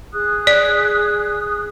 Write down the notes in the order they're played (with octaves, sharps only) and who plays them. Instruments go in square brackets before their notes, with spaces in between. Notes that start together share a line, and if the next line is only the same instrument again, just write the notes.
[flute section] G#4 D#6 F#6
[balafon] D5